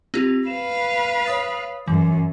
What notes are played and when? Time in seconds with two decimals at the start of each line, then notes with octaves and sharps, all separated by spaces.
0.14 C4 F4 G4
0.47 B4 F5 E7
1.25 C#5 D#6 A6
1.88 F#2 E3